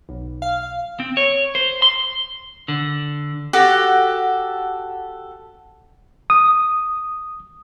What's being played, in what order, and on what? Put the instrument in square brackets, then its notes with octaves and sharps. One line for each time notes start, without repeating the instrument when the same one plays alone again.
[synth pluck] B1
F5
[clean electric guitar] C4
C#5
C5
C6
D3
[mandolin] F#4 G4 A4
[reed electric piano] D#6